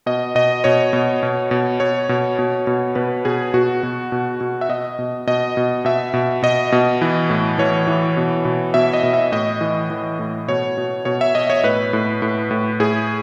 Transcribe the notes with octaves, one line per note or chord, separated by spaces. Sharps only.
B2 D#5
B2 D#5
B2 C#5
B2
B2
B2
B2 C#5
B2
B2
B2
B2 B4
B2 G#4
B2 F#4
B2
B2
B2
E5
B2 D#5
B2
B2 D#5
B2
B2 E5
B2
B2 D#5
B2
E3
A2
E3 C#5
E3
B2
B2
B2 E5
D#5
B2
E5
A2 D#5
E3
E3
A2
B2 C#5
B2
B2 C#5
E5
B2 D#5
C#5
A2 B4
A2
A2
A2
A2 G#4